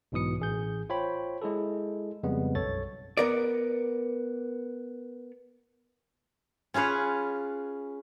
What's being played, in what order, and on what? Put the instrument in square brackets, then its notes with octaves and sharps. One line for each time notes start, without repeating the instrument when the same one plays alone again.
[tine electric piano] B1 G#2 B2 E3 D#6 C#7
A1 G#4 G6
F4 C5 C#5 G5 B5
G#3 E4 G#4 A4
F2 C#3 G3 G#3 B3
B1 F#2 A4 C#5 A6
[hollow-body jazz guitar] B3 A#4 D5
[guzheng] C#4 F4 G#4 B4 C#5